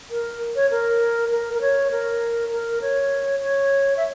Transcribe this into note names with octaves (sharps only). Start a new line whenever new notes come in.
A#4
C#5
A#4
A#4
A#4
C#5
A#4
A#4
C#5
C#5
E5